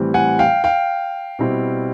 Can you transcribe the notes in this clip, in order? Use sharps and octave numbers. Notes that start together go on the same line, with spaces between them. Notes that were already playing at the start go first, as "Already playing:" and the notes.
Already playing: A2 E3 G3 C4
F#5 G#5
F5 G5
F5 G5
B2 G3 C4 E4